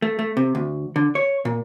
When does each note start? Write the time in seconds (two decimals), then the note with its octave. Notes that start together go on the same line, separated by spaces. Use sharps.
0.02 A3
0.19 A3
0.37 C3
0.55 D2
0.96 D3
1.15 C#5
1.45 A#2